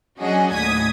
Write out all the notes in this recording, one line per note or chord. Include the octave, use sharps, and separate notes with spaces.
F#3 C#4 D4 F#4 G#4 D#5
D#2 A2 D#6 G#6 B6